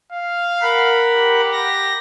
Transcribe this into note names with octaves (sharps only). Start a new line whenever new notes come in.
F5
A#4 F#5 B5
G4
A#6